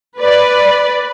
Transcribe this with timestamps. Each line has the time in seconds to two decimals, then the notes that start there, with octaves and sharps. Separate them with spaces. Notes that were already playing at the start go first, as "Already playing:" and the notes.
0.18 B4 D5